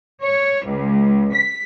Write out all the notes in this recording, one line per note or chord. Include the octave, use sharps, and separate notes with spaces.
C#5
C#2
B6